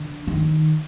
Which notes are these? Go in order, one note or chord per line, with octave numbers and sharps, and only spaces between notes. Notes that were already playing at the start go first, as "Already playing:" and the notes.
Already playing: D3
D#3